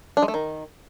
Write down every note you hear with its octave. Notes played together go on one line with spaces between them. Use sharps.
D4
G#3
A3
D#3